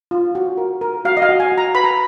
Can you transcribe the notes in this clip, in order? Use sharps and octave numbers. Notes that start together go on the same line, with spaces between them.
F4
F#4
A#4
A#4
F#4 F5
D#5
F5
F#4
G#5
F#4
A#5
B4 B5
A#5